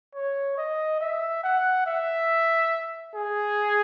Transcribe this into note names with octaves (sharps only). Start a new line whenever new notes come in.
C#5
D#5
E5
F#5
E5
G#4